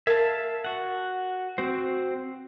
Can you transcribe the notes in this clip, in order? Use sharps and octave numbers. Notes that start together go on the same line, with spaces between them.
A#4 E5 F5 A5
F#4 F#5
C4 F#4 C5